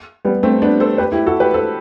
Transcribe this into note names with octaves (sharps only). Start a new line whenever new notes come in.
G3 B3
A3 C4
B3 D4
A4 C5
G4 B4
E4 G4
F#4 A4
G4 B4
A4 C5